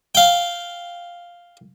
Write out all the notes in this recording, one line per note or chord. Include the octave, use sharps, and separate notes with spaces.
F5 G5